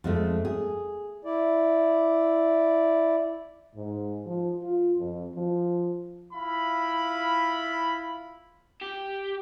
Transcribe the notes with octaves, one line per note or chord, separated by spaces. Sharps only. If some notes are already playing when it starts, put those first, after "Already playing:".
F2 G#3 A3
G#4
E4 D5
G#2
F3
F4
F2
F3
E4 F4 B5
G4